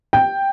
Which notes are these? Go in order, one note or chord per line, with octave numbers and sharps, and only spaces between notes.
G5